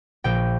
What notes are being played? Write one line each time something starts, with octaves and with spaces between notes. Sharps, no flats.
A#1 G5